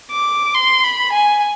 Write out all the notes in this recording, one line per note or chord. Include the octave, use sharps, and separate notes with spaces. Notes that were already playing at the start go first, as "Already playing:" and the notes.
D6
C6
B5
G#5